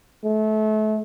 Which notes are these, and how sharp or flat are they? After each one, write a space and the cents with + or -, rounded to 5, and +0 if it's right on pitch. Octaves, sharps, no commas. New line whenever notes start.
A3 -30